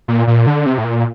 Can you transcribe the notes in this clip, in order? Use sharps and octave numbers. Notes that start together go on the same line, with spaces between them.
A#2
A#2
D3
C3
A2
A#2